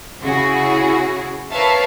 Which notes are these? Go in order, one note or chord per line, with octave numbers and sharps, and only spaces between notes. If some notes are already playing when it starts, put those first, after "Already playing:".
C#3 E4 F#4 G#4
A#4 B4 C#5 E5 F5 A5